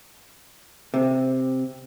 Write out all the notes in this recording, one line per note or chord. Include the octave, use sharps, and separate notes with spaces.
C3